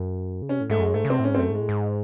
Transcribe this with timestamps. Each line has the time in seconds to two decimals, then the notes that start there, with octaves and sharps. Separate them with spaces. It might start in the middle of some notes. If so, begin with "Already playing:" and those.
Already playing: F#2
0.42 C#3
0.49 C3 C#4
0.60 A2
0.70 G#2 A3
0.79 F#2 G#3
0.94 G#2 A3
1.05 C#3
1.10 C3 C4
1.19 A2
1.24 C#4
1.30 G#2
1.34 C4
1.39 F#2 A3
1.50 G#2
1.55 G#3
1.60 A2
1.69 G#2